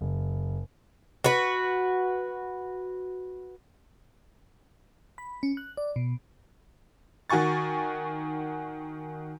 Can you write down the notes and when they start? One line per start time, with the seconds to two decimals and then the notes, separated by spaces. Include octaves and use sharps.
0.01 F#1
1.24 F#4 B4
5.18 B5
5.43 C#4
5.57 F#6
5.77 D5
5.96 B2
7.30 D#3 F#4 G#5 C#6 A6